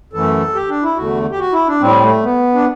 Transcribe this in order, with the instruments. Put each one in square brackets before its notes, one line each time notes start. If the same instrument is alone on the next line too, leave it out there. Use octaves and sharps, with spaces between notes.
[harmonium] F#2 E3 A3 A4
G4
D4
E4
E2 D3 A3 F#4
G4
F#4
E4
D4
A2 G3 C4
A3
B3
D4